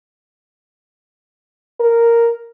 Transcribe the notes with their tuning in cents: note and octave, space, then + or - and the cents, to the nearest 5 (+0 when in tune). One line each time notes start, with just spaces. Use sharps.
A#4 -5